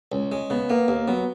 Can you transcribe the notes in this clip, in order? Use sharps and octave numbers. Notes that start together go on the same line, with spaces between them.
C#2 C#4
G#3 C#4
C#3 B3
A#3 B3
D#2 A#3
F#3 B3